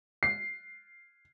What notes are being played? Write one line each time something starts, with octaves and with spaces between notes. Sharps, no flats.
C7